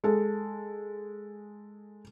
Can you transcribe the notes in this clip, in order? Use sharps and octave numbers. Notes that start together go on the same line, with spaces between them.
G#3 A4